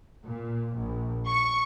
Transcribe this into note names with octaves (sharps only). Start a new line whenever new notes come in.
A#2
A#1
C#6